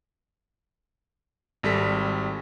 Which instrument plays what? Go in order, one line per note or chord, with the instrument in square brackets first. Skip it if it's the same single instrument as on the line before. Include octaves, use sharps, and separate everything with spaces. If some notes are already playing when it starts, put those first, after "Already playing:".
[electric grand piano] G#1 G3 A4 B6